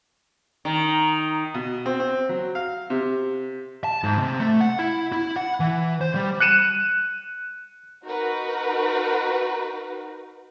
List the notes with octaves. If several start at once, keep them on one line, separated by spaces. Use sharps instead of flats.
D#3 A#5
B2
C4
C4
F#3
F5
C3
A5
G#2
C3
A3
F#5
E4
E4
F#5
E3
C5
G3
F#6 C#7 D#7 E7
D#4 F#4 A#4 B4